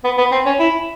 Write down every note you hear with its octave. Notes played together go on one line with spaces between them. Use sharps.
B3
B3
C4
C#4
E4